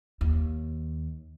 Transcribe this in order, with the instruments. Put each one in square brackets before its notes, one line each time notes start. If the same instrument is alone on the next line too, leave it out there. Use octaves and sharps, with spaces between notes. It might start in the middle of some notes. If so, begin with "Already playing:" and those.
[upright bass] D#2